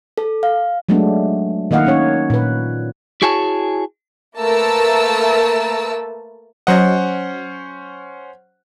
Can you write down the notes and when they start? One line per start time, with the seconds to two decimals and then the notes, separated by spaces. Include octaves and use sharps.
0.18 A4
0.43 F5
0.89 F#3 G#3 A3 B3 D4
1.71 D#3 A#3 D#5 F5 F#5
1.85 A#3 C#4 C#5
2.30 A#2 B4
3.22 E4 F#4 G#4 C#5 G#5 A5
4.39 A3 A#3 A#4 B4 A5 E6
6.67 F#3 C#4 C5 D#5 F#5